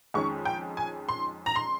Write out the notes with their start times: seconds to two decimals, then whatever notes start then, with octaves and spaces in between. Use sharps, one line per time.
0.14 F2 D#3 G#3 C#4 C#6
0.45 G5
0.77 G#5
1.09 C6
1.46 A#5
1.56 C6